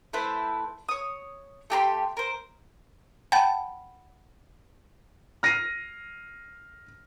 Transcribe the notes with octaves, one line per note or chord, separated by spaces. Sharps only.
A3 E4 B4 C5
C#5 D#6
A3 G4 A#5 C6
A#4 C5
F#5 G5 A5 B5
F6 A#6 C7 D#7